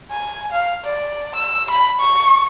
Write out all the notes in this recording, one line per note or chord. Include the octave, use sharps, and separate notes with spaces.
G#5
F5
D5
E6
B5
C#6